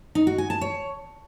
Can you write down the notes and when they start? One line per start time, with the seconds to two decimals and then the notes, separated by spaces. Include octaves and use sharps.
0.15 D#4
0.27 F#4
0.38 G#5
0.50 A5
0.61 C#5